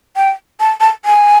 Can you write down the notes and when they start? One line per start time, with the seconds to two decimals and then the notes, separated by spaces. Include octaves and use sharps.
0.16 G5
0.60 A5
0.80 A5
1.05 G#5